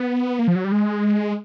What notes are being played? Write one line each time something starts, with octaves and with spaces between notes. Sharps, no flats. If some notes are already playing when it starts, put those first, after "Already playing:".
Already playing: B3
A#3
F3
F#3
G3
G#3